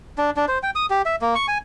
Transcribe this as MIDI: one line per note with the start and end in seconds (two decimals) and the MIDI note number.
0.18 0.30 62
0.37 0.45 62
0.48 0.58 72
0.63 0.70 79
0.75 0.86 87
0.90 1.02 67
1.05 1.16 76
1.22 1.34 58
1.35 1.46 85
1.48 1.58 80